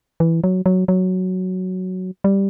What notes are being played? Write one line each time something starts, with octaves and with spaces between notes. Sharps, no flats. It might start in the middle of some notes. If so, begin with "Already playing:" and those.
E3
F#3
F#3
F#3
G3